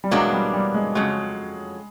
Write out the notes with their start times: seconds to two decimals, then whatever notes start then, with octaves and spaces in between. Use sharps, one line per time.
0.04 G3
0.11 E2 B2 F#3 G#3 A#3 D4
0.33 G3
0.54 G3
0.74 G#3
0.95 F2 C#3 F#3 G#3